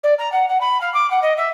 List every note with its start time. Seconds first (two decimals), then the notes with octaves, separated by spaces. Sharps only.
0.03 D5
0.18 A#5
0.32 F#5
0.48 F#5
0.60 B5
0.81 F5
0.93 D6
1.10 F#5
1.22 D#5
1.37 E5